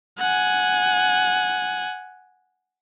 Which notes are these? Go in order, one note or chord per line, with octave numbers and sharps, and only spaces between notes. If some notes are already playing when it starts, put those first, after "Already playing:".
F#5 G#5